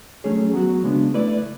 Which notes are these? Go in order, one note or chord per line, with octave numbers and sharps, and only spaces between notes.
F#3 A3 C#4 G#4 C#5
F#3 B3 F#4
C#3 G#3 B3 D4
A3 E4 B4 D5